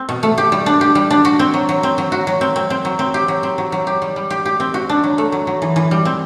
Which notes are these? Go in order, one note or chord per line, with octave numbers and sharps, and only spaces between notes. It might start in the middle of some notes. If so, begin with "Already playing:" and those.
Already playing: C4
B2
A3
G4
G3
D4
G4
G3
D4
F#4
C4
F#3
F#3
C4
F#3
F#4
F#3
C4
C4
C4
F#3
C4
G4
F#3
C4
F#3
F#3
G4
G3
G3
G4
G4
C4
F#4
D4
F#3
A3
F#3
F#3
E3
E3
G3
C4